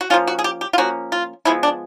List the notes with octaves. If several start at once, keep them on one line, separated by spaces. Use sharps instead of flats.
F#4
F3 A#3 C#4 F4
F#4
G#4
G4
G4
F4
F3 A#3 C#4 F#4
F4
F3 G#3 B3 E4
D4